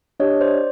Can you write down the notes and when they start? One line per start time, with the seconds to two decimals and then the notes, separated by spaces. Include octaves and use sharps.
0.20 D4 G4 C#5 D#5
0.41 C5 D5